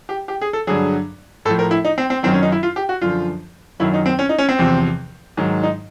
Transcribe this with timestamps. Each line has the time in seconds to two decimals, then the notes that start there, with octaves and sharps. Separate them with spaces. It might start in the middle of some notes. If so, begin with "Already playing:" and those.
0.09 G4
0.28 G4
0.41 G#4
0.53 A4
0.67 G2 D3 F#3 G#4
1.45 A2 A4
1.50 F3
1.59 A#4
1.71 E4
1.85 D#4
1.98 C4
2.10 C4
2.23 F#2 D#3 F#3 C4
2.33 C#4
2.43 D#4
2.52 E4
2.63 F4
2.76 G4
2.89 F#4
3.02 F#2 D3 F3 F4
3.80 F#2 D#3 F#3 E4
3.94 D#4
4.06 C4
4.19 C#4
4.29 D#4
4.38 C#4
4.49 C4
4.59 E2 C3 F3
5.37 G#2 D#3 F#3
5.63 D#4